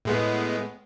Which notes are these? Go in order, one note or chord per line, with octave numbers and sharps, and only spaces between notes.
A2 G#3 B3